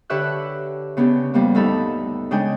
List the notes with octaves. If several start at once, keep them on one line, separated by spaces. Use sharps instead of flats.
D3 G4 B4 C#5 E5 F#6
C#3 B3 C#4 D4 G4
F2 G3 A#3 B3
D2 G2 D#4 A4 B5
C#3 G#3 D4 G5 G#5